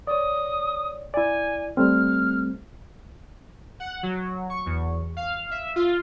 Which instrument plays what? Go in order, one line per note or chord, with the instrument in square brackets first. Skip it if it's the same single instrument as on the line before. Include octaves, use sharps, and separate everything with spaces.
[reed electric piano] C#5 D5 [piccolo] D#6
[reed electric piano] E4 D5 [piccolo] G#5
[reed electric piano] G3 A3 C4 [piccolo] F6
[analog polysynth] F#5
F#3
C#6
E2
F5
E5
F4